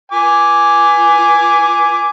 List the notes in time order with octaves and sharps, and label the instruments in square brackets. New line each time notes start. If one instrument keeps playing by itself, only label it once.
[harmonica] G#5 D6